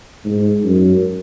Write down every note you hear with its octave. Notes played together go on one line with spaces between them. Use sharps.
G#2
F#2